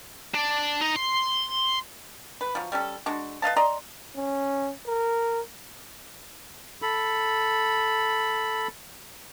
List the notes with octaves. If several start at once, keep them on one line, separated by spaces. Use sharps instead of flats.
D4
D#4
C6
B4
F3 F#3
G3 C#4 A4
G#3 D4 F#4
B4 D#5 F5 A5
D5 D#5 A#5 C6
C#4
A#4
A4 B5